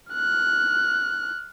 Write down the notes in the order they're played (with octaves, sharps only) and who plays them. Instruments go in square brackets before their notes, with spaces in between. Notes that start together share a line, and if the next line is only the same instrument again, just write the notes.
[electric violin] F6 F#6